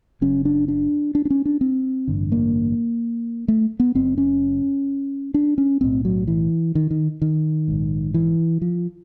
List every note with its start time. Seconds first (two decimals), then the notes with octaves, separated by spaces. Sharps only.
0.21 F#1 F#2 C#3 C#4
0.45 D4
0.68 D4
1.15 D4
1.25 D4
1.30 C#4
1.45 D4
1.61 C4
2.08 A1 G2 D3
2.32 A#3
3.48 A3
3.80 B3
3.95 F#1 F#2 C#3 C4
4.18 C#4
5.34 D4
5.58 C#4
5.81 B1 A2 C4
6.05 F#3
6.27 E3
6.75 D#3
6.91 D#3
7.22 D#3
7.68 A#1 G#2
8.14 E3
8.62 F3